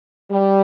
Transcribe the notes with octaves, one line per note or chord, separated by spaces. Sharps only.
G3